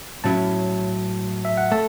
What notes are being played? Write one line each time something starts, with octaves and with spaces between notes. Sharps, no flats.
A2 F#3 C#4 E4 A5
E5
F#5
A3 A5